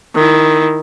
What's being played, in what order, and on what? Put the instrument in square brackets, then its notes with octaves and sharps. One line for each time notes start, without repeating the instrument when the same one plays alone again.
[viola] D#3 E4